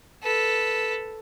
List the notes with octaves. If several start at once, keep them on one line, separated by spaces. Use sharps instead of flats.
A4 B4